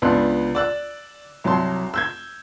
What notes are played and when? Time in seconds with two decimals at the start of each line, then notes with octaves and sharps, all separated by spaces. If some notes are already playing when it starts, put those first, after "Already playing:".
0.02 C#2 B3 D4 C6 F#6
0.55 D5 E6 F#6
1.44 C2 F#3 A5 C6
1.94 E6 G6 G#6